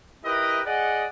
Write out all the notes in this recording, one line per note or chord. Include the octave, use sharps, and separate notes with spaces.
E4 G4 A#4 B4 D#5 E5
G#4 D5 D#5 F#5